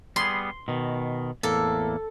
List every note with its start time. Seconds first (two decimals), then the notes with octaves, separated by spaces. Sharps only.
0.16 G3 B3 G#4 C6
0.68 B2 D#3
1.43 E2 A2 A#3 A4